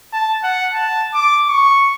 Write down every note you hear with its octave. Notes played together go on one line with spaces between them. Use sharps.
A5
F#5
A5
D6
C#6